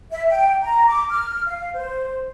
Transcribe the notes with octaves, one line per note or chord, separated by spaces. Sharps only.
E5
G5
A#5
D6
F6
F5
C5